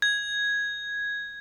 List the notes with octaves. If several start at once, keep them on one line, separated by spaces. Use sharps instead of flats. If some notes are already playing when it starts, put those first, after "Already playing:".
G#6